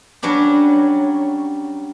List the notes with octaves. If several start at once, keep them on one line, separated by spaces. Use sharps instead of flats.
F#3 G3 C#4 D4 G4